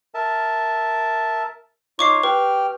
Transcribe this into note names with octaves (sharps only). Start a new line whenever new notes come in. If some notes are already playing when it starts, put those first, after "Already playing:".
A#4 E5 A5
D#4 F4 C#5 C#6 D6 C7
G4 B4 G5 F6